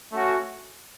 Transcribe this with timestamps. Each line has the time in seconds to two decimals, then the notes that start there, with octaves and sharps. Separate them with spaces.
0.12 A3 C#4 F#4